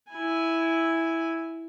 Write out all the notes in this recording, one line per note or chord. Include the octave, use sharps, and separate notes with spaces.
E4 G#5